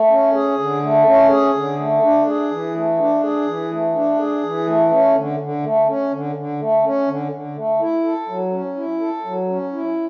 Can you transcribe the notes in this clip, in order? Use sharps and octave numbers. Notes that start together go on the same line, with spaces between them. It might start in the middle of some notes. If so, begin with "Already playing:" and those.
Already playing: A3
C#4
G#4
D3
A3
C#4
G#4
D3
A3
D4
G#4
E3
A3
D4
G#4
E3
A3
D4
G#4
E3
A3
C#4
D3
D3
A3
C#4
D3
D3
A3
C#4
D3
D3
A3
E4
A4
F#3
C#4
E4
A4
F#3
C#4
E4